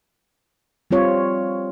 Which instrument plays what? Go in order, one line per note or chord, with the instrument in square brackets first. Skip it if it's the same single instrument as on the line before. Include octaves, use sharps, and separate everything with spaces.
[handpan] G3 C4 F4 C#5